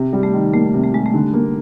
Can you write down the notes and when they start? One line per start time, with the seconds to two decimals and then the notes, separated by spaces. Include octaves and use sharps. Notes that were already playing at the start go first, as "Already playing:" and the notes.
Already playing: C3
0.13 G3
0.23 A3
0.34 D#3
0.53 A3 A#3
0.74 C3
0.84 A3
0.93 G3 G#3
1.06 A3
1.14 D3
1.34 A#3